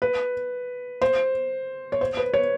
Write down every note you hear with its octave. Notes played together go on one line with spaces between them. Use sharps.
B4
C5
C#5
C5
B4
C#5